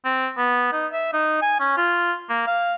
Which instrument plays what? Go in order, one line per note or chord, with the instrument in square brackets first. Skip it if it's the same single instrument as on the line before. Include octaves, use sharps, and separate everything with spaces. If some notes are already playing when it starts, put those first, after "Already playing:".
[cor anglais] C4
B3
D#4
E5
D#4
G#5
C#4
F4
A#3
F5